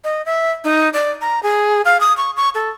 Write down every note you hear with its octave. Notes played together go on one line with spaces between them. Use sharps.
D#5
E5
D#4
D5
A#5
G#4
F5
D#6
C#6
C#6
A4